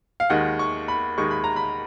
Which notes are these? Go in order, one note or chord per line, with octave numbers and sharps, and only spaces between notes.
F5
D#2 D#3 G#3 F#5
C#6
B5
D#2 D#3 G#3 C#6
B5
A#5
B5